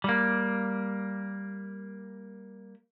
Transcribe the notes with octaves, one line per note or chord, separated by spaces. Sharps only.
G3 A#3